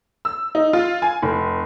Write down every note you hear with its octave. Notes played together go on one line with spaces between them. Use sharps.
E6
D#4
F4
G#5
F1